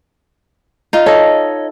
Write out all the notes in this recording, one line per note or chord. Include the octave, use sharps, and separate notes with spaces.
D#4 F4
A4 C#5 D#5